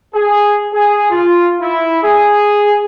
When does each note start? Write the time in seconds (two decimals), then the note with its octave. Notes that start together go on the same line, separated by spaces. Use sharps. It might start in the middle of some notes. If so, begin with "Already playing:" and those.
0.15 G#4
0.74 G#4
1.11 F4
1.62 E4
2.03 G#4